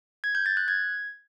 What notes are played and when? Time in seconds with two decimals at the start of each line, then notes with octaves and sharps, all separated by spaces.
0.24 G#6
0.35 G6
0.46 A6
0.57 F#6
0.68 G#6